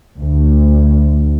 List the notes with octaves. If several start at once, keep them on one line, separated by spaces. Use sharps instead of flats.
D2